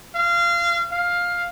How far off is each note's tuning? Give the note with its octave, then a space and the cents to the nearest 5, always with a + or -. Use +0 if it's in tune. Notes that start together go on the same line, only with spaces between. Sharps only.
F5 -25
F5 +10